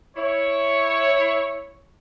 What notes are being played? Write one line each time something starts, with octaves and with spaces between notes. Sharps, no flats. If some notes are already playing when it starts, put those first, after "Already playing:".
E4 C#5